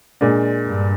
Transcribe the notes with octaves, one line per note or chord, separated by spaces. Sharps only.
A#2 G#3 D4
G2